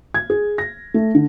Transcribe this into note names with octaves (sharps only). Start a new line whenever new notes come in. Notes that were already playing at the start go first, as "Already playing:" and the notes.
G#6
G#4
A#6
A3
D3